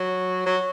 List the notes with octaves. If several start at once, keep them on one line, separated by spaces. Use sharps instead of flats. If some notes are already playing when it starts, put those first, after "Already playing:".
Already playing: F#3
F#3